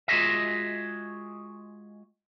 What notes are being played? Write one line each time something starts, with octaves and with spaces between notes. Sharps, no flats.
G#3 F4 F#4 G#4 D#5 E5